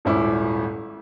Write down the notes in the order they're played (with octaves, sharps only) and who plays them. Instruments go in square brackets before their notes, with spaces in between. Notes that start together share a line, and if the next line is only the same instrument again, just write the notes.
[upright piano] D#1 G#1 C#4 E4 D6